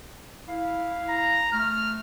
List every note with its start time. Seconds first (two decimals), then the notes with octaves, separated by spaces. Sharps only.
0.48 E4 F5
1.09 A#5
1.53 A3 F6